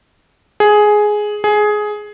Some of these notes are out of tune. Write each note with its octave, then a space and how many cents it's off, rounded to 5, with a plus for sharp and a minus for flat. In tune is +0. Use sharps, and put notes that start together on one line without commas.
G#4 +10
G#4 +15